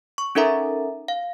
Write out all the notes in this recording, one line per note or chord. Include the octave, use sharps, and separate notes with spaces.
C#6
C#4 D#4 A4 A#4 E5 A#5
F5